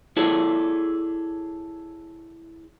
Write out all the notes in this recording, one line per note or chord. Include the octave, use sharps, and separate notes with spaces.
E4 G#4 A4 C#5 D5